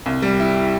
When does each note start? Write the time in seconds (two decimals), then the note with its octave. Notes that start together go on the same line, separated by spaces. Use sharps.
0.06 C2
0.22 G3
0.40 E4